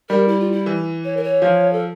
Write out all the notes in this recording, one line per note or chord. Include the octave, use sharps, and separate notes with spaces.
G3 A#4
E4
F4
E4
E3
C#5
A#4
C#5
F3
A4